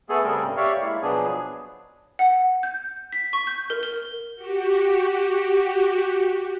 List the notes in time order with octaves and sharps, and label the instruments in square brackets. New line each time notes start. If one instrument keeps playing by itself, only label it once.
[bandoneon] A3 B3 G#4 A4
C#3 G3 C4 A4 A#4
G2 C3
G4 C#5 D5 E5 F5 C#6
G#3 A#3 E4
B2 F3 F#3 B3 D4 G#4
[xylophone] F#5
G6
B6
C#6
G6
A#4
G7
[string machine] F#4 G4